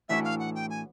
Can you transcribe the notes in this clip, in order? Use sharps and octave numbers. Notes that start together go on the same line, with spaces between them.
A2 E3 A3 D4 F#4 E5
F5
F#5
G5
G#5